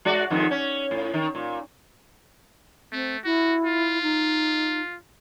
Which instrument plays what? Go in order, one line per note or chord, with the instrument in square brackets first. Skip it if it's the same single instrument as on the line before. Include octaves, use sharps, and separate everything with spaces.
[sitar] G#3 F#4 D5
F2 G#2 D#3
C#4
A2
D#3
A#2
[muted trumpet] A3 [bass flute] C4
[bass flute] E4 [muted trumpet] F#4
[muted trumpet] F4
[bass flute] D#4